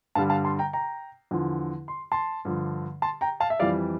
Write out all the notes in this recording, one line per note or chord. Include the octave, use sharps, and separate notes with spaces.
G2 D3 G3 F5 A5
F5 A5
A5 C6
G5 A#5
G5 A#5
E2 D3 F3
C6
A5 C6
G2 D3 F3
A5 C6
G5 A#5
F5 A5
E5
F2 E3 G3 D5 F5